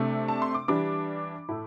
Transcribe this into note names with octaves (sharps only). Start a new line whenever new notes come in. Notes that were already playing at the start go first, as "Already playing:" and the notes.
Already playing: C3 A3 D4
A5
C6
D6
E3 G3 D4 D6
A2 A3 E4